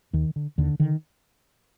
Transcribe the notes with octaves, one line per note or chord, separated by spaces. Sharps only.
D#2 D#3
D3
D#2 D3
D3 D#3